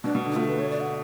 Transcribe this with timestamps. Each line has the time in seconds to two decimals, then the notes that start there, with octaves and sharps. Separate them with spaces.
0.04 B2 D4
0.15 B2
0.25 D3
0.32 D4
0.36 A3 F4
0.48 B4
0.59 C#5
0.70 D5
0.80 F#5